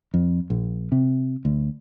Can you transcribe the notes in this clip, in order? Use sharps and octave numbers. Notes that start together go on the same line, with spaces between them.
F2
A#1
C3
D2